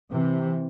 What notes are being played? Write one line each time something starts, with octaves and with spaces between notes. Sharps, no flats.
C3 E3